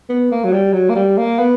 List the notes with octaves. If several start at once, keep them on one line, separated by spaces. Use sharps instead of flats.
B3
A#3
F#3
G3
F#3
A#3
G3
A#3
B3